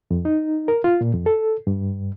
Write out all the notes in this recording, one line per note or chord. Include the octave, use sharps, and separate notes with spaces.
F2
D#4
A#4
F4
A#2
F2
A4
G2